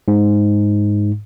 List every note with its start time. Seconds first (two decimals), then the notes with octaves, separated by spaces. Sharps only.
0.08 G#2